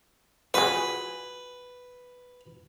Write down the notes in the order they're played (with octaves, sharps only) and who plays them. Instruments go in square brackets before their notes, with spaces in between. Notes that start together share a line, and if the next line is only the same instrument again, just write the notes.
[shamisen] F4 F#4 G#4 [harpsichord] B4